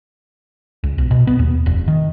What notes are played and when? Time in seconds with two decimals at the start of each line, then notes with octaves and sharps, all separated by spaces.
0.84 C#2
0.98 B1
1.11 B2
1.27 B3
1.39 D#2
1.66 F1
1.88 D#3